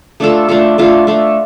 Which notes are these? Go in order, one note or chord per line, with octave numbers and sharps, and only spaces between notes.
A3 D4 F4 A4
A3 D4 F4 A4
A3 D4 F4 A4
A3 D4 F4 A4